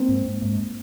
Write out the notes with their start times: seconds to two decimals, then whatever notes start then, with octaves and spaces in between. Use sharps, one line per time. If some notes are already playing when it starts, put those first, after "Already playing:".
Already playing: A#3 C4
0.08 G#2
0.26 G#2
0.42 G#2